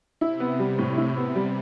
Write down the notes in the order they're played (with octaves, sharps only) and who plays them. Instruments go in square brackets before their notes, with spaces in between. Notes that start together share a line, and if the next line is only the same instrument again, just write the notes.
[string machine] C3 [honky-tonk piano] E4
[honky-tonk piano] B3
G3
A2
E4
B3
G3